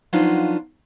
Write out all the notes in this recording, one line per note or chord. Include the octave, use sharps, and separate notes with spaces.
F3 F#3 B3 D4 D#4 F4